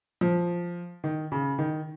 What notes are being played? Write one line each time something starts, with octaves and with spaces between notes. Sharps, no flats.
F3
D#3
C#3
D#3